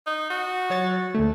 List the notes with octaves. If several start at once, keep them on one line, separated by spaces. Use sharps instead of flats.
D#4
F#4
F#3 C#5 A6
D2 D3 A3